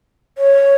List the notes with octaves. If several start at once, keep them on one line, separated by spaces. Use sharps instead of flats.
C#5